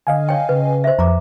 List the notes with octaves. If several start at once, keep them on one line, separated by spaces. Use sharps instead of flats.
D3 D#5 F5 G#5
C#5 G5
C#3 B4
C5 E5
F2 A#5 D6